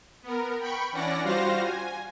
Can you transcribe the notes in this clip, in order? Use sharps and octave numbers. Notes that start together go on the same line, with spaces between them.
B3 A#4
G5 B5 C#6
E3 C#4 D4 D5 F#5 A#6
G3 F4 F#4 C5 F5 A#6
G#5